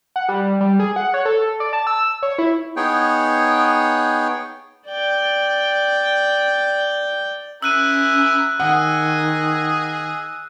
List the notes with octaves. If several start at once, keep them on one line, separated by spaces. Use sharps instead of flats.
F#5
G3
G3
G#4
F#5
C#5
A4
D5
A5
E6
C#5
E4
B3 D#4 G#4 C#5 G5
D5 G5
C#4 E4 A#4 E6 F#6 D#7
D#3 G#4 D#5 F#5